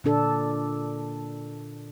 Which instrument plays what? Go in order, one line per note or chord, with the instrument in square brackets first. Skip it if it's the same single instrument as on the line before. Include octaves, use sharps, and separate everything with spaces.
[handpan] A#2 D3 D4 A4